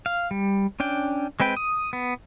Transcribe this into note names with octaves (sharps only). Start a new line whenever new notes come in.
F5
G3
C#4 D4 G5
G#3 C4 B4 G5
D#6
B3